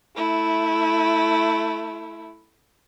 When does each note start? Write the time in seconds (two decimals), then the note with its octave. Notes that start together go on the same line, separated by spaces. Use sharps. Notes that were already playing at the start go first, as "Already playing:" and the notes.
0.16 A3 E4